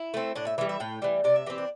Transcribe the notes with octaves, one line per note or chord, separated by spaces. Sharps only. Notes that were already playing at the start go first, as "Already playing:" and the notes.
Already playing: E4
A3 C4
A2 D4
E5
E3 G3 E5
E5
A2 G5
E3 G3
C3 D5
E5
E3 C4 G4
D4